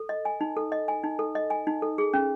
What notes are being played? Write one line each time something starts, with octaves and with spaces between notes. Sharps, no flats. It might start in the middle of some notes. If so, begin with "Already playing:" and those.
Already playing: A4
D#5
G#5
D#4
A4
D#5
G#5
D#4
A4
D#5
G#5
D#4
A4
G#4
C#4